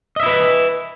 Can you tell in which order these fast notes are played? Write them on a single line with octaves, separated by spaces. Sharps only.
D#5 E5 E4 B4